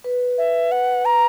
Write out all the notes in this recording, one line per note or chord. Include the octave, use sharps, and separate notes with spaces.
B4
E5
F#5
A#5